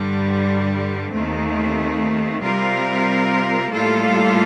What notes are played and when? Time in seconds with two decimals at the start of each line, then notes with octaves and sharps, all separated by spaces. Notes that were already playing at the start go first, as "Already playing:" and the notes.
Already playing: G2 D3 G3
1.11 D#2 D#3 A3 C4
2.42 C3 G3 C4 F4 A#4
3.72 A2 G3 A#3 F4 A4